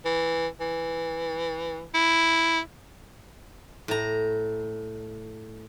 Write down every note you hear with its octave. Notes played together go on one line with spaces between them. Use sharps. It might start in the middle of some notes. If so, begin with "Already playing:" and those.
E3
E3
E4
A2 A#5